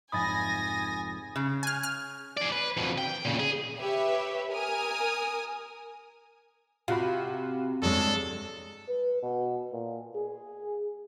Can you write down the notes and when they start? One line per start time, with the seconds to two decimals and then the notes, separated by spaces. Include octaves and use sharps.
0.12 F1 G#2 G#5 B5 D#6 A6 A#6
1.36 C#3
1.63 G#5 F6
1.83 F6
2.37 G#4 D5
2.52 B4
2.77 F2 B2
2.98 G5
3.25 A#2 C#3
3.40 G#4
3.78 G4 B4 C#5 E5
4.51 A#4 G#5 D#6 F6
6.88 C3 F4 F#4 B5
7.82 E2 G2 G#3 A4 C#5
8.88 B4
9.22 B2
9.72 A#2
10.15 G#4